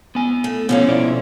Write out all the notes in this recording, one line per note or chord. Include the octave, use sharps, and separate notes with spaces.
B3 G#5
A3
D3 F3 B3 C#4 G4 F5
B2 E4 D5